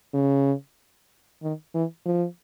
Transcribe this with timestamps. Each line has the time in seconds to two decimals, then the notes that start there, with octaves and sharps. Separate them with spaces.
0.14 C#3
1.43 D#3
1.74 E3
2.06 F3